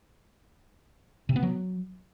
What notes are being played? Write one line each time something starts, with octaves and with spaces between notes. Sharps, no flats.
C3
B3
F#3